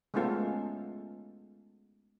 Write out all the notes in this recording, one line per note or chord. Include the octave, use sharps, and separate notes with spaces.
G#3 A3 B3 C#4 F4 A4